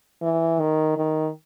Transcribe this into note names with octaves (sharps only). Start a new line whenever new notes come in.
E3
D#3
D#3